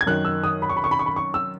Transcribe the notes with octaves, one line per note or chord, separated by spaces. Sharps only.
G#6
F#2 D#3 F#6
E6
D#6
B5
C#6
B5
C#6
B5
C#6
B5
C#6
E6